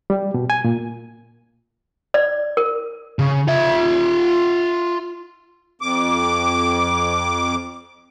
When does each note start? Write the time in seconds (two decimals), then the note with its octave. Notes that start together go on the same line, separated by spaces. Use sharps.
0.10 G3
0.34 B2
0.50 G#5
0.64 A#2
2.14 D5
2.57 A#4
3.19 C#3
3.48 F4 E5
5.81 F2 D6